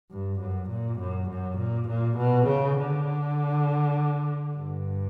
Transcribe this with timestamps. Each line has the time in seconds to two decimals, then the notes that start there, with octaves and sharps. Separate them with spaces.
0.11 G2
0.41 F#2
0.70 A#2
1.00 F#2
1.30 F#2
1.59 A#2
1.89 A#2
2.18 B2
2.48 C#3
2.78 D3
4.56 G2